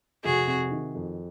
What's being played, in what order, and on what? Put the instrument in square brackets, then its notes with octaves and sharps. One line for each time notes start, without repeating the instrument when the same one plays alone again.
[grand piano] F1 [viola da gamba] F#4 G#4
[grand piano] C3
D#3
F2